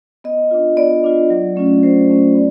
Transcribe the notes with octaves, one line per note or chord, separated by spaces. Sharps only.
B3 D#5
D4 F4
B3 D5
D4 F4
F#3
A3 C#4 F4
F#3 C5
A3 C#4 F4
B3